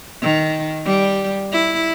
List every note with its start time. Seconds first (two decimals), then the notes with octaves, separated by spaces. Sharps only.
0.22 D#3
0.85 G3
1.52 E4